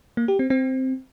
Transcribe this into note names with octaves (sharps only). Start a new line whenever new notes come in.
A#3
G4
C4
C4